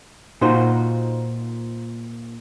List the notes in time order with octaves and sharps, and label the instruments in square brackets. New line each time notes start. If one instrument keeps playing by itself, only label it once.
[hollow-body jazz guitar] A#2 D#4 F4 F#4 C5